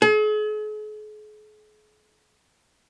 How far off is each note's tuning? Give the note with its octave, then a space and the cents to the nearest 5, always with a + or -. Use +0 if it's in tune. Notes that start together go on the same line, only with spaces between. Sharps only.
G#4 +45